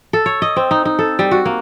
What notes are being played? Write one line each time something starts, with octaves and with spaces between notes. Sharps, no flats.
A4
C#5
D#5
C4
D#4
D#4
A4
G3
F#4
A#3